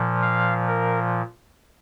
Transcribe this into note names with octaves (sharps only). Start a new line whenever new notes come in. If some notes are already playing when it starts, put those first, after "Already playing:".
Already playing: A#2 F3
F5
A#4